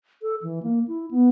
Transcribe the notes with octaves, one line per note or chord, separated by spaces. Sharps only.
A4
E3
A#3
E4
B3